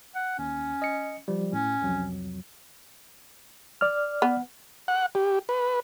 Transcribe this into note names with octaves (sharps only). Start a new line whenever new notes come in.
F#5
D#2 C#4
D#5 C#7
F3 G3
A2 C#4
C2 F2 F#3
D5 F6
B3
F#5
G4
B4